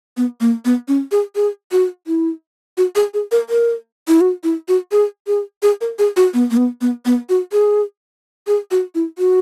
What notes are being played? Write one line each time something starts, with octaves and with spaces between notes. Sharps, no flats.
B3
A#3
B3
C#4
G#4
G#4
F#4
E4
F#4
G#4
G#4
A#4
A#4
E4
F#4
E4
F#4
G#4
G#4
G#4
A#4
G#4
F#4
B3
A#3
B3
B3
B3
F#4
G#4
G#4
F#4
E4
F#4